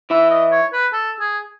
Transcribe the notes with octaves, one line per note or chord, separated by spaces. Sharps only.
E3 E4 E5
D#5
C#5
B4
A4
G#4